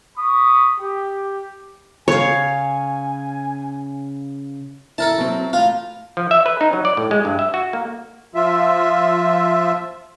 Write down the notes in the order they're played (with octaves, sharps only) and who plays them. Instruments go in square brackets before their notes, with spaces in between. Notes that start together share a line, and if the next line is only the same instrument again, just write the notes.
[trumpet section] B5 C#6 D#6
G4
[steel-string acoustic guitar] C#3 F5 [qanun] C#5 [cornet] G#5
[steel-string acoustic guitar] E4 [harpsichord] A4 A#4 A5
[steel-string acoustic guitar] F#3 C4
[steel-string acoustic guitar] A2 A#5 [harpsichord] F4
[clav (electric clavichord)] F3
E5
B4
D#4
F#3
D5
A2
G#3
G2
E5
F#4
A#3
[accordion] F3 F4 E5